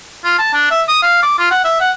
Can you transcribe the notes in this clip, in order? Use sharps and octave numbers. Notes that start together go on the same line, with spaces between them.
F4
A5
D4
E5
D#6
F5
D6
F4
F#5
E5
F#5